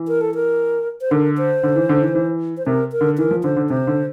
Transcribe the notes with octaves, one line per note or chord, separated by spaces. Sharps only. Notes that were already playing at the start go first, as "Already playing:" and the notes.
Already playing: E3
A#4
A4
A#4
C5
D3 A#4
C5
D3
E3
D3
E3
E3
C5
C3 A#4
A#4
D3
E3 A#4
F3
D3 C5
D3
C3 C5
D3